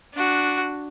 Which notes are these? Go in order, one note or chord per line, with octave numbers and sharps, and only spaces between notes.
D4 F#4